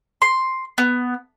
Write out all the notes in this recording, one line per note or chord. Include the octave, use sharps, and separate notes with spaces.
C6
B3